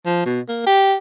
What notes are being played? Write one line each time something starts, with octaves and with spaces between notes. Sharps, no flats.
F3
B2
A#3
G4